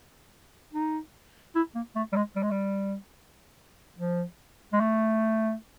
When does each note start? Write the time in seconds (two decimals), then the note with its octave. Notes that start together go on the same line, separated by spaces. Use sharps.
0.74 D#4
1.55 E4
1.75 A#3
1.96 A3
2.12 G3
2.16 G#3
2.36 G3
2.43 G#3
2.51 G3
3.98 F3
4.73 G#3
4.80 A3